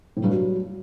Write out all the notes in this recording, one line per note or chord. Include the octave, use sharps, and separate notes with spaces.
A2
G2
F#3